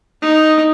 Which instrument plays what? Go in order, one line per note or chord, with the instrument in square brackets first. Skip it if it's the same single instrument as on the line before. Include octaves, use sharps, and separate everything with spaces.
[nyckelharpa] D#4